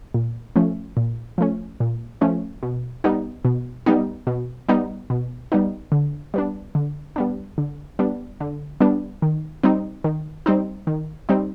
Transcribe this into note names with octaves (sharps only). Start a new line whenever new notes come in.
A#2
F3 A3 C#4
A#2
F3 A3 C#4
A#2
F3 A3 C#4
B2
G3 B3 D#4
B2
G3 B3 D#4
B2
G3 B3 D#4
B2
G3 B3 D#4
D3
G3 B3 D4
D3
G3 B3 D4
D3
G3 B3 D4
D3
G3 B3 D4
D#3
G3 C4 D#4
D#3
G3 C4 D#4
D#3
G3 C4 D#4